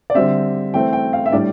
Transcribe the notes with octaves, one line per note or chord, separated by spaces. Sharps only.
D5
D3 G3 C4 E5
E3 A3 C4 G5
G5
F5
E5
A2 G3 D4 D5